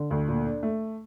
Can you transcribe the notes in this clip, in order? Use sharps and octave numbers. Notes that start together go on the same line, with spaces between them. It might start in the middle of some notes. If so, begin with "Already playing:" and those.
Already playing: D3
D2
A#2
D4
A3